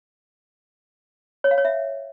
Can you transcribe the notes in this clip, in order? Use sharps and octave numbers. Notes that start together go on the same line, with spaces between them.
C#5
F5
C#5
E5